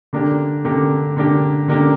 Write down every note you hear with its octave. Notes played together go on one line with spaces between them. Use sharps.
D3 A#3 D4 G4
D3 A#3 D4 G4
D3 A#3 D4 G4
D3 A#3 D4 G4